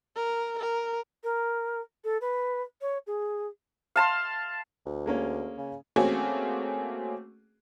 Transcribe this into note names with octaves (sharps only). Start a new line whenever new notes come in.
A#4
A#4
A#4
A4
B4
C#5
G#4
F5 A5 C6
D2
G#3 A#3 C#4
C#3
A3 A#3 C4 C#4 F#4 G#4